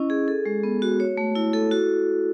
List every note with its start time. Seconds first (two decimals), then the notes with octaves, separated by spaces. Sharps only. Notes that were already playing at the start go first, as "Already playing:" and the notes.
Already playing: C#4 E4 D#5
0.10 G#4
0.28 A4
0.46 G#3
0.63 B3
0.82 F#4
1.00 C#5
1.17 A3
1.35 E4
1.53 A4
1.71 F#4